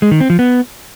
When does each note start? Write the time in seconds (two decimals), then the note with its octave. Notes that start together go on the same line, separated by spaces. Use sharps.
0.02 G#3
0.11 D#3
0.21 C4
0.30 F3
0.39 B3